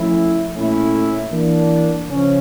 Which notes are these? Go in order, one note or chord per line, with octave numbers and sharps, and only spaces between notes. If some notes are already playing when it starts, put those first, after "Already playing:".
Already playing: F3 A3 C#4 E4
A#2 A3 C#4 E4
E3 A#3 D4
C#3 F3 C#4